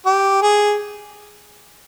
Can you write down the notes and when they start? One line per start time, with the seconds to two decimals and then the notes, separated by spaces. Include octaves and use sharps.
0.06 G4
0.42 G#4